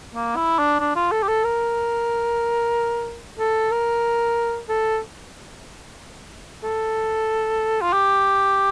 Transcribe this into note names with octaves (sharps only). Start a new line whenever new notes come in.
A#3
E4
D4
D4
F4
A4
G4
A4
A#4
A4
A#4
A4
A4
F4
G4